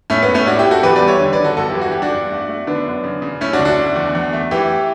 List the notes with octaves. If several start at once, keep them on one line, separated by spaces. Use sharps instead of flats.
A2 A3 C#4
B3
A2
A3 C#4
A2 D4 F#4
E4 G4
A2
F#4 A4
E2 G4 B4
B4 D5
G3
C#5 E5
D3
B4 D5
D3
F#4 A4
G2 F#4 A4
E4 G4
E3
F#4
G3 G4
D4 F#4
G2
A3
A3
D3 B3 D4
F#2
C#3
C#3
A3 C#4 E4
D4 F#4
D2
D4 F#4
A3
E2
E2
A3
E3 E4 G4